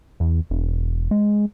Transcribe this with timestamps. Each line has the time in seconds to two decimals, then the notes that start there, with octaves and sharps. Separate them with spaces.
0.20 E2
0.50 E1
1.11 G#3